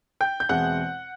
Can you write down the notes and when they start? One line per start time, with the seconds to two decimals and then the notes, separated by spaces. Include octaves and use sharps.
0.21 G5 G6
0.40 G6
0.49 E2 B2 G#3 C4 E4 F#5 F#6